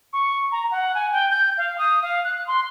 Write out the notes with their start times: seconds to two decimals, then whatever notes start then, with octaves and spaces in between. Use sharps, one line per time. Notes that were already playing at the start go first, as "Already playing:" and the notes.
0.13 C#6
0.51 A#5
0.71 F#5
0.95 G#5
1.12 G5
1.30 G6
1.57 F5
1.78 D#6
2.02 F5
2.24 F#6
2.47 C6